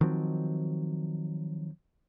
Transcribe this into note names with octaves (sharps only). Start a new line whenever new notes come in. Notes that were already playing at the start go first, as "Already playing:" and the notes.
D#3 F3 F#3 C4